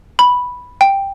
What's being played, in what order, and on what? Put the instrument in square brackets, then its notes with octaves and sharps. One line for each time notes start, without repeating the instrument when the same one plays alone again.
[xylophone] B5
G5